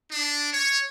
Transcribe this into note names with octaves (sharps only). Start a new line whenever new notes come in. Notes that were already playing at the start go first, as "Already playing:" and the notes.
D4
C#5